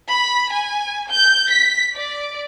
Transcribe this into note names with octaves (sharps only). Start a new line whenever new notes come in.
B5
G#5
G6
B6
D5